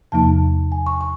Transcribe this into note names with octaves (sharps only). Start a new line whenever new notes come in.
E2 C3 F3 A#3 D#4 A5
G#5
C#6
C#6